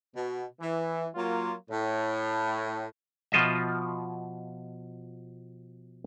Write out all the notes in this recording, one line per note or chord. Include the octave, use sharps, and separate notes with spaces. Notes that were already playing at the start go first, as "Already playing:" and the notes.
B2
E3
F#3 A#3 F4
A2
B2 F3 F4 D#5 E5